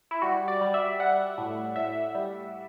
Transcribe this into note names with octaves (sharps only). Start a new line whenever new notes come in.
E4
G3 F#4
D5
G3
E5
G3 F#5
A2
A2 E5
G3